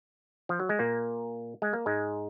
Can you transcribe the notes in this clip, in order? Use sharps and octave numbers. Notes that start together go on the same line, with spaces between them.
F3
F#3
G#3
A#2 A#3
G#3
A#3
G#2 G#3